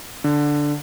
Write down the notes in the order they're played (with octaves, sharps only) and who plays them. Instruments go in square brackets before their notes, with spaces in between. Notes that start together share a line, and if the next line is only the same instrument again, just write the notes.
[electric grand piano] D3